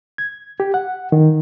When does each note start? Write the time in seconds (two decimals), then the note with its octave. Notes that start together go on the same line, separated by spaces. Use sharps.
0.18 G#6
0.60 G4
0.74 F#5
1.12 D#3